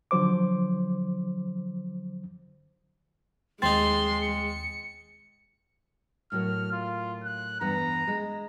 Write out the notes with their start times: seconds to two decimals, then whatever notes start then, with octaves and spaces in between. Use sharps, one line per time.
0.11 D3 F3 F#3 C5 D6
3.62 D#2 G#3 C4 D#4 C6 A6
4.21 C#7
6.32 A2 F#3 A#3 F6
6.72 F4
7.24 F#6
7.61 E2 G2 B3 A#5
8.07 G#3